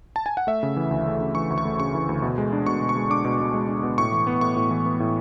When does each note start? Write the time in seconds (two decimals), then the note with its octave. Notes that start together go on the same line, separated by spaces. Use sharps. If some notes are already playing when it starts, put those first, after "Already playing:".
0.16 A5
0.26 G#5
0.37 F#5
0.47 A3 E5
0.63 C#3
0.77 E3
0.91 D2
1.06 A3
1.21 C#3
1.35 E3 C#6
1.50 D2
1.58 C#6
1.65 A3
1.80 C#3 C#6
1.94 E3
2.09 D2
2.22 B2
2.38 G#3
2.53 D4
2.66 B2 C#6
2.81 B2
2.89 C#6
2.96 G#3
3.10 D4 D6
3.25 B2
3.40 B2
3.54 G#3
3.68 D4
3.83 B2
3.98 A2 C#6
4.12 E3
4.27 B3
4.41 A2 C#6
4.56 A2
4.71 E3
4.86 B3
5.00 A2